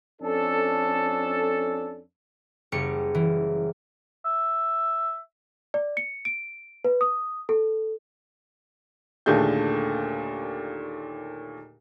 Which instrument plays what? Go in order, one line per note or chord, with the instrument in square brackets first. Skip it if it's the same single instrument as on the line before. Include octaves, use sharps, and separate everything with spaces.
[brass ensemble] F2 C#4 D4 A4
[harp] F#1 G3 C#7
E3
[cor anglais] E5
[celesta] D5
C#7
D7
B4
D#6
A4
[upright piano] D#2 A#2 D3 A3 G#4 G6